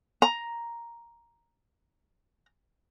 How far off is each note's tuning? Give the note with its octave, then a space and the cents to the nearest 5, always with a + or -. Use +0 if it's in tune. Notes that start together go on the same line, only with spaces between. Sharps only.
A#5 +5